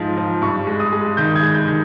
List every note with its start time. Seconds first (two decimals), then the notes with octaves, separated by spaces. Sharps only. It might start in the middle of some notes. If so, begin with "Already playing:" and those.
Already playing: G#2 F3 D#4
0.17 F3
0.42 G2 C#6
0.67 G#3
0.80 D#6
0.93 G#3
1.17 D#3 G6
1.36 G#6
1.43 G#3
1.55 G6
1.68 D#3